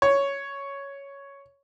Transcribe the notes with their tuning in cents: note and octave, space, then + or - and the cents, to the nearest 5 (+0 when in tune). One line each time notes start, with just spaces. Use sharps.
C#5 +5